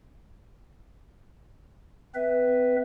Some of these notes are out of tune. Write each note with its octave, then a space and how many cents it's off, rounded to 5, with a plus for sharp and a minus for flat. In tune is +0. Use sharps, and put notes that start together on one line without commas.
C4 -40 B4 +0 E5 +0